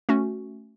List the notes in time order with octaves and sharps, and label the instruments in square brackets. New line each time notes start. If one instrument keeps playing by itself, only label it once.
[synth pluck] A3 C#4 F#4